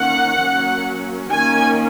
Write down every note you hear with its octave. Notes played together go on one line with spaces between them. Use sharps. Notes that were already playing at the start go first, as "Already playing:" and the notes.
Already playing: D#3 A#3 C#4 F#5
F#3 A#3 C#4
D#3 A#3 C#4 G#5